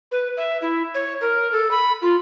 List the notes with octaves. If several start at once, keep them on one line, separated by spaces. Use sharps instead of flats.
B4
E5
E4
C#5
A#4
A4
B5
F4